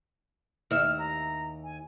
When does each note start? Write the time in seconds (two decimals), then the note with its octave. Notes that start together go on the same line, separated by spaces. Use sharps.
0.71 D#2 E5 F6
0.98 A#5
1.63 G#5